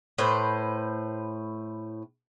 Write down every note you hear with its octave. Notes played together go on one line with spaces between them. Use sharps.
A2 B4 C5